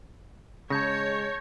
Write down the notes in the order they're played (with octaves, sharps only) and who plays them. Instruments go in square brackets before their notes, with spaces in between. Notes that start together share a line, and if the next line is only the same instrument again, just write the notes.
[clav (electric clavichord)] C#3 [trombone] G#3 [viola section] C#5 [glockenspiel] A5 G6 A#6